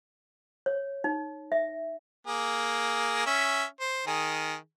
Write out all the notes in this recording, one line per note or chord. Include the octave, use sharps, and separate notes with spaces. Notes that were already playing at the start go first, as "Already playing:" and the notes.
C#5
D#4
E5
A#3 G#4
C#4 E5
C5
D#3 G#4